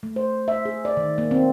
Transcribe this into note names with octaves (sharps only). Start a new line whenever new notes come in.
A3
C5
E5
G#4
D5
D#3
A#3
C4